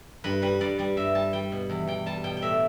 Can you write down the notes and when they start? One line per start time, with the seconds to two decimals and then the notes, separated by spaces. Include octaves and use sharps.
0.24 G2 B4
0.42 G3 B4
0.61 G2 D5
0.79 G3 D5
0.97 G2 E5
1.15 G3 A5
1.33 G3 G5
1.52 B2
1.70 E2
1.87 E2 G5
2.06 G3 A5
2.24 B2 G5
2.37 G5
2.42 A2 E5